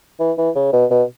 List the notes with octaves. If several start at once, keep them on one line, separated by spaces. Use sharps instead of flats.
E3
E3
C#3
B2
B2